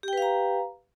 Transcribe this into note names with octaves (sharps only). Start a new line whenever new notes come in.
G4 B4 F5 G5 A#5